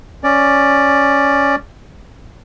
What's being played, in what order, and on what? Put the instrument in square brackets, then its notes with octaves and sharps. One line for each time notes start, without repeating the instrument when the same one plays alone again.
[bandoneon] C#4 D5